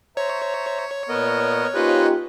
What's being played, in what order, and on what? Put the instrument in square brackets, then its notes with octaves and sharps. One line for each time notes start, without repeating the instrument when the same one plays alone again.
[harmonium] C5 E5 A#5 [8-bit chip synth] C#5
[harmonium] A#2 [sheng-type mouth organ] B3 A#4 D#5
[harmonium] A#3 C#4 [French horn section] D#4 F4 G4 [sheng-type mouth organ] B4 C5 D#5